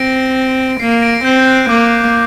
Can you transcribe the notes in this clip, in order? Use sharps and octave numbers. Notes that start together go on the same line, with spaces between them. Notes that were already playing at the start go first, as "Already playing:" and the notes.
Already playing: C4 A#6 D7
A#3 C7
C7
A#6 D7
C4 G6
G6
F#6
A#3 D6